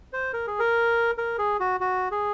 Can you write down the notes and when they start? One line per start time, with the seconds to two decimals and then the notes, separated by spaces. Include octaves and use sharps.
0.13 C5
0.33 A#4
0.47 G#4
0.59 A#4
1.18 A#4
1.38 G#4
1.60 F#4
1.80 F#4
2.11 G#4